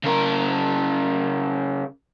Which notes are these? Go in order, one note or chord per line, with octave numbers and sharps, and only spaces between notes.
C#3 A#4